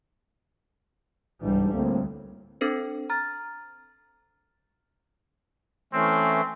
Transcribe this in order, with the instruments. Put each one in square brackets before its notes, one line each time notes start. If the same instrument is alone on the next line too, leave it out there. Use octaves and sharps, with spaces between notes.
[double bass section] G1 C2 G3 [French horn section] G#2 E3 D4
[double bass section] D2 [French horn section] A2 A#3 C4
[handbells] C4 D4 A4 C5
A#5 F6 A6
[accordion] E3 A3 C#4 [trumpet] C4